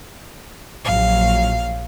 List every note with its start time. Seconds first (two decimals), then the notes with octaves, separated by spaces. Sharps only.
0.84 A#1 F#3 F5